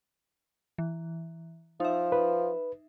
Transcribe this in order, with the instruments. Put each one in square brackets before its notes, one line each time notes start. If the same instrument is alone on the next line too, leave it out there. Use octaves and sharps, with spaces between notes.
[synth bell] E3
[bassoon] F3 [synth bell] D#4 E5
[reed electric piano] B4